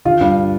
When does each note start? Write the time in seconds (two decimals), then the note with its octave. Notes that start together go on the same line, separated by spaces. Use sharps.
0.05 D3 F4
0.21 G2